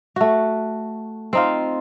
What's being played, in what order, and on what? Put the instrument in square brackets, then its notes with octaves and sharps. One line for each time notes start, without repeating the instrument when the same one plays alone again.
[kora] A3 F#4
C4 D#4 F4